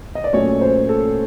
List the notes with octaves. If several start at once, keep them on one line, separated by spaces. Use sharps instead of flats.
D#5
D5
A#2 F#3 A3 C#4 C#5
C5
A4